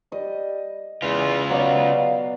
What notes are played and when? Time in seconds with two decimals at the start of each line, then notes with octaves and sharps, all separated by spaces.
0.12 G3 D#5
1.02 E2 C#3 F4
1.50 B2 F#3 B3 D5 F5